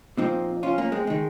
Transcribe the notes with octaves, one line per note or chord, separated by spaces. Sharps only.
A#2 F3 C4 D#4
C#4 F4
A#3 C#4
G#3 C4
D#3 G#3